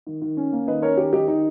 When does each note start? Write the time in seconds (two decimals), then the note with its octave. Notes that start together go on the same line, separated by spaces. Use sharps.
0.07 D#3
0.22 D#3
0.37 C#4
0.52 A#3
0.67 D#3 B4 D#5
0.82 C#4 A#4 C#5
0.97 D#3 G4 A#4
1.13 D#3 D#4 G4
1.28 D#3 D#4